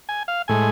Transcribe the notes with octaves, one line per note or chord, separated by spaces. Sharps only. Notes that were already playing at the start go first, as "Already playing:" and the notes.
G#5
F5
A2 G#3 G#5